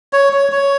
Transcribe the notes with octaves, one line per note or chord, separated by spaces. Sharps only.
C#5
C#5
C#5